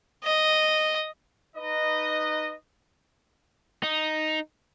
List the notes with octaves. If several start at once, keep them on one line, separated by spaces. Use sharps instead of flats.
D#5
D#4 B4 D#5
D#4